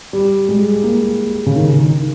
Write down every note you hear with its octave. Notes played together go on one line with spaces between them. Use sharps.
G3
G#3
A#3
C#3
D#3
D#3